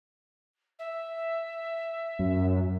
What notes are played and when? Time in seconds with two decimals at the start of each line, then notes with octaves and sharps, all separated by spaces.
0.78 E5
2.19 F#2